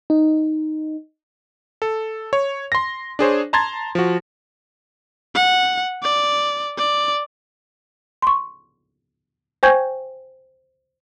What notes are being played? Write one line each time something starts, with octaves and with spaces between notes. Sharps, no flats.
D#4
A4
C#5
C6 A#6
D4 G#4 C5 C#5
A5 A#5 C6 G#6 A6
F3 F#4
F#5
D5
D5
C6 C#6
C5 G5 G#5 C#6 G6 G#6